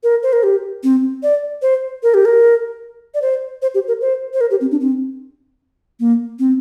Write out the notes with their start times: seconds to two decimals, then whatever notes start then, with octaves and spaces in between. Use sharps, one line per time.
0.03 A#4
0.23 C5
0.33 A#4
0.43 G4
0.83 C4
1.23 D5
1.62 C5
2.03 A#4
2.14 G4
2.25 A#4
3.14 D5
3.22 C5
3.62 C5
3.75 G4
3.88 A#4
4.01 C5
4.34 C5
4.41 A#4
4.51 G4
4.61 C4
4.71 D4
4.81 C4
6.00 A#3
6.39 C4